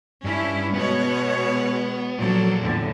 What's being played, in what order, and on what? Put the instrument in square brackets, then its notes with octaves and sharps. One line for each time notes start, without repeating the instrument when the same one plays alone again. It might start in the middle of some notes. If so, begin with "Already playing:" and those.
[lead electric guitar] G2 [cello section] C#4 E4
[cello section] B2 G#3 C#5 [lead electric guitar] B3
[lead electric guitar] A#2 F3 [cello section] F#3 A4
[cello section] E2 A2 D3